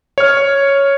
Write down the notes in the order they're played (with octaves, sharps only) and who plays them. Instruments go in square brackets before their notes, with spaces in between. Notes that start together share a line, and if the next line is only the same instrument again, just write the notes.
[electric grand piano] C#5 F6